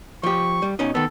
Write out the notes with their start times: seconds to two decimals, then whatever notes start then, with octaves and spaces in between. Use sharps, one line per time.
0.23 F3 G4 C#6
0.62 G3
0.79 B2 C#4 D#4
0.95 D#3 B3 A4